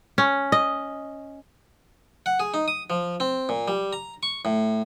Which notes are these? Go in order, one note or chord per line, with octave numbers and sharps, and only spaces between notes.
C#4
D#5
F#5
G#4
D#4
D#6
F3
C4
A#2
G3
A#5
C#6
A2